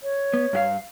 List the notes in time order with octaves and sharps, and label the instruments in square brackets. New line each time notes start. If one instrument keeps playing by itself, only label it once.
[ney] C#5
[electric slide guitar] B3
G2 F#4 F5